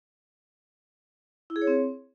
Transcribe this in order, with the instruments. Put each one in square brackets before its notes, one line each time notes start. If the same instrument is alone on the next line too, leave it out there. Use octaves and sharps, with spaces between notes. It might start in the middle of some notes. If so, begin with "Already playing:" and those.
[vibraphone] E4
G#4
C#5
C4